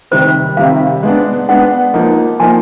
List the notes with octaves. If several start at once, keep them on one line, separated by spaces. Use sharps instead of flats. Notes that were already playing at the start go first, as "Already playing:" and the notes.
C3 D#3 G3 C5
C3 D#3 G3 F5
G#3 B3 D4
G#3 B3 D4 F#5
F3 A#3 D#4
F3 A#3 D#4 G#5